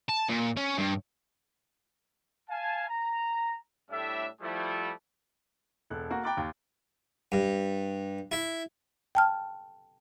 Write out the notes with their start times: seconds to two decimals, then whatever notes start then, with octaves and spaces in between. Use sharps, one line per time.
0.09 A5
0.29 A#2
0.57 C#4
0.78 G2
2.50 F5 G#5 A5
2.88 A#5
3.91 A2 G3 D4 E5
4.42 F3 G3 A3 E4
5.90 E1 A4 F#6
6.10 A#3 F#4
6.23 G5 A#5 B5 D6 F#6 A6
6.37 D#2
7.32 G2
8.32 E4
9.15 G5 A5 F6